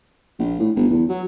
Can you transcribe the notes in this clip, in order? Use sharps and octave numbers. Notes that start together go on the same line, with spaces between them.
A#1
A2
G1
E2
F#3